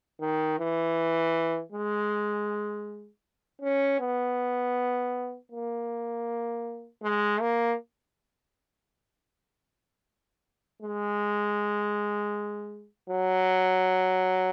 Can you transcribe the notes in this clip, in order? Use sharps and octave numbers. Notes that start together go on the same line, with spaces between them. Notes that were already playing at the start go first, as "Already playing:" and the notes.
D#3
E3
G#3
C#4
B3
A#3
G#3
A#3
G#3
F#3